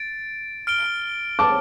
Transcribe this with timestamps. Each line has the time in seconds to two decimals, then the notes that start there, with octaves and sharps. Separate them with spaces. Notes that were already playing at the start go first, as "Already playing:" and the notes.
Already playing: A6 D7
0.67 F6 D7 G7
1.39 A5 D6